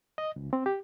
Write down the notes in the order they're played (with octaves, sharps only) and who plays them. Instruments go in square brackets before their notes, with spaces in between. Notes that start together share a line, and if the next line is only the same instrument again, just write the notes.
[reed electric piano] D#5
C#2
C4
G4